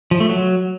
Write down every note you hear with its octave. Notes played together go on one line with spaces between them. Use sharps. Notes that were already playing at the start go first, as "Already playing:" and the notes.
F3
A3
F#3